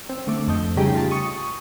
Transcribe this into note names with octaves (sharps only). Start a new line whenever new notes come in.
C4
D3 A3 D6
F2 A4 D#5 G6
A2 C#3 G3 D#4 G4 G#4
F4 A5
C#6 D#6